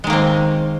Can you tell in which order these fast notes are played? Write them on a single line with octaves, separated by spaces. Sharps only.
G#3 D#3 A#3 C4